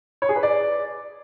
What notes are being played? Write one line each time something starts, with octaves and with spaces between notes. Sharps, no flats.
C#5
G#4
B4
D5